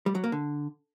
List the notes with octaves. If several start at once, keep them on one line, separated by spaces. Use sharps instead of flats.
G3
F#3
A#3
D3